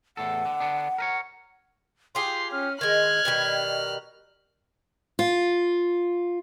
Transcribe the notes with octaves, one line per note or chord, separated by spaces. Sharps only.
E2 A2 A4 F#5
D3
D3 B3 D4
A#4 B4 C#5
F4 G4 G#4 C6
C#4 F6
D#3 G#3 F6 F#6 G#6
B2 D#3 G3
F4